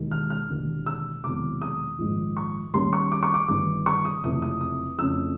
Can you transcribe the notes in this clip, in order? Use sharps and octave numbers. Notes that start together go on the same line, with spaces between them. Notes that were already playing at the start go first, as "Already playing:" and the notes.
Already playing: E1 D#2 D#3 G#3
F6
F6
E1 D#2 D3
E6
E1 E2 C3 D#3 F#3 D6
D#6
A#1 G#2 D#3
C#6
D#2 D#3 G3 A#3 C#4 C6
C#6
D6
C#6
D6
G1 G2 D#3 D6
C#6
D#6
F#1 F2 C3 E3 A3 D#6
D#6
D#6
F2 C#3 E3 A3 C#4 E6